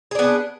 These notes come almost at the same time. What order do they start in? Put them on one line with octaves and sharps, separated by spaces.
G#4 D4 B3